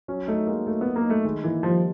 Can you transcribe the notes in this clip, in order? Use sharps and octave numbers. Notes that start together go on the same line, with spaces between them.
F#3 C#4
A3 D#4
G#3 A#3
F#3 A3
F#3 B3
A#3
D#4
A3
D#3 G#3
E3 A#3
F3 G3